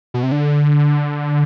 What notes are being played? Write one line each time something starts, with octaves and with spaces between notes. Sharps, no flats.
B2
C3
D3